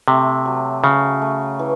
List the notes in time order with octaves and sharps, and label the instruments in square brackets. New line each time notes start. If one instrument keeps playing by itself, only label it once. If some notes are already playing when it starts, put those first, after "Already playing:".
[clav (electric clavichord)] C3 [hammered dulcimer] A3
[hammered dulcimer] F#3
[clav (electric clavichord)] C#3 [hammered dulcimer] F#3
[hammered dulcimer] A3
E3